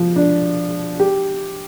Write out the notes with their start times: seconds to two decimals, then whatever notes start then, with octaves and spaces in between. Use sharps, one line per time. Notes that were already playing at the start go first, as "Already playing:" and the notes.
Already playing: F3
0.16 D4
0.99 G4